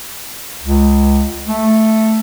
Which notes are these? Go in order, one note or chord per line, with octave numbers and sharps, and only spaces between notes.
C#2
A3